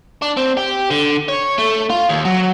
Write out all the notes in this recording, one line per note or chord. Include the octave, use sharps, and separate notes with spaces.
D4
C4
G4
D3
C#5
A3
F4
D#2
F#3